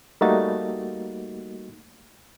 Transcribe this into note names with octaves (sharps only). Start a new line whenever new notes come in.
G3 A3 A#3 D#4 F#4 A6